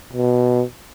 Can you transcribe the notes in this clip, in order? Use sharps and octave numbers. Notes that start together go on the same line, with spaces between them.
B2